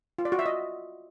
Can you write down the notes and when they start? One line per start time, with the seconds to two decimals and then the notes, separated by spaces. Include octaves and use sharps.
0.18 F4
0.25 D5
0.32 F#4
0.39 E5
0.46 D#5